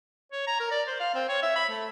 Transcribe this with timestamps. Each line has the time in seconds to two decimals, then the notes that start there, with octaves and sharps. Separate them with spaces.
0.32 C#5
0.47 A#5
0.60 A#4
0.71 D5
0.87 C5
1.00 F5
1.15 C4
1.29 C#5
1.42 E5
1.56 B5
1.69 A3